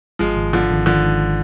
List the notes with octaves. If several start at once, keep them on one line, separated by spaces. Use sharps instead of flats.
G#1 F3 G#3
G#1
G#2 D3 F3
G#1
D3 D#3 F3
G#2